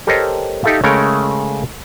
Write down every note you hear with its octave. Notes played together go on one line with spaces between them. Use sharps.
G4 A4 A#4 C5 C#5 D#5
D#4 G4 A4 E5 F5
C#3 G#3 A3 A#4 C#5 G5